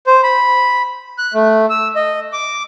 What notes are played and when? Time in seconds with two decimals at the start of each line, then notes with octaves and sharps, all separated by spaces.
0.07 C5
0.23 B5
1.18 F#6
1.34 A3
1.70 E6
1.96 D#5
2.33 D6